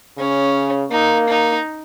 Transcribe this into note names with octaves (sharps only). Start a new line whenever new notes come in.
C#3 C#4
A#3 D#4
D#4